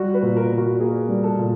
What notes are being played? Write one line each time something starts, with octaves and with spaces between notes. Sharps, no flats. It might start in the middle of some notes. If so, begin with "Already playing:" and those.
Already playing: G3 F#4
B4
A#2
A#4
A#2
F#4
A#3 G#4
G3
A4
A#2